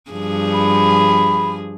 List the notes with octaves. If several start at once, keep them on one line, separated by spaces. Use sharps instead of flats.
G2 F3 G#4
B5